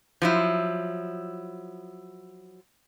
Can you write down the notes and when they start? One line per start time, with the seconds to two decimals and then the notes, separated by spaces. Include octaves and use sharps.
0.22 F3 F#3 E4